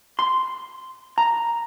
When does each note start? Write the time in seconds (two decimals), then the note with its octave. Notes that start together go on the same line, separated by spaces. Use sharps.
0.19 C6
1.18 A#5